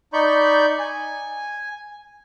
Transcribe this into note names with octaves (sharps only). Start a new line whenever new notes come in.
D#4 D5 B5 C#6 G6
G#5